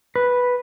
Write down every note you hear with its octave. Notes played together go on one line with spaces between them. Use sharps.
B4